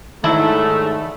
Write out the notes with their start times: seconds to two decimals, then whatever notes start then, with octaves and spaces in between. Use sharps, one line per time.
0.24 G#2 D3 D#3 F#3 A3 E4